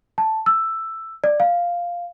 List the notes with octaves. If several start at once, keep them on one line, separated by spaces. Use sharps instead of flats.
A5
E6
D5
F5